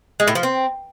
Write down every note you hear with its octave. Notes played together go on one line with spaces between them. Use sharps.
G#3
A2
F3
C4